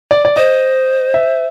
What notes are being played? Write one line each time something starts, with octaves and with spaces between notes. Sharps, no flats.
D5
D5
C5 D#5
E5